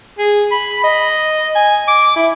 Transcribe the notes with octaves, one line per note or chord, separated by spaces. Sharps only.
G#4
B5
D#5
G#5
D6
E4